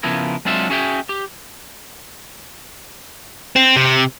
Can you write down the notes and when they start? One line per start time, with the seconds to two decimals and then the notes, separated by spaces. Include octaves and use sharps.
0.03 C#3 F3 B3 E4 A#4
0.45 F#3 G#3 C4 D4 F4 E5
0.70 C#4 F#4 G#4 E5 F5 G5
1.09 G4
3.56 C4
3.76 C3